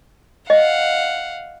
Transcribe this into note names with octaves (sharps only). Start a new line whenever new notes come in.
D#5 F5 F#5